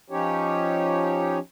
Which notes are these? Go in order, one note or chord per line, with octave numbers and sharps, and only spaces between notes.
F3 C#4 D#4 G4 C#5